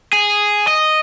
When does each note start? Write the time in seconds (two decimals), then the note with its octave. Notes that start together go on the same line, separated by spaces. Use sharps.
0.13 G#4
0.68 D#5